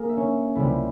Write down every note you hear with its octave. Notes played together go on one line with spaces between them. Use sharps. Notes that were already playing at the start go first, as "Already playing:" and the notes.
Already playing: A#3 G#4 A#4
E5
C#4 C#5
C#2 C3 G3 E4 E5